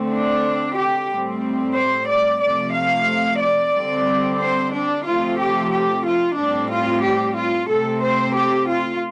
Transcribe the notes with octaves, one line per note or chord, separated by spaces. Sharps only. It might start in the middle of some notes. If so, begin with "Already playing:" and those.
Already playing: D3 A3 C4
D4
G4
A2 G3 C4
C5
D5
C3 F3 A3 D5
F5
D5
D3 G3 C4
C5
D4
C3 F3 A3 C4 F4
G4
G4
F4
A2 G3 C4 D4
F4
G4
F4
C3 A3 C4 A4
C5
G4
F4